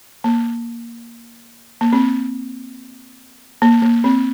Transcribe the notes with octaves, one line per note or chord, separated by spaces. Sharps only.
A#3
A#3
C4
A#3
A#3
C4